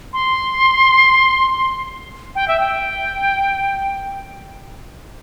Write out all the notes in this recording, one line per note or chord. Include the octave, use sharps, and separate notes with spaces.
C6
G5
E5
G5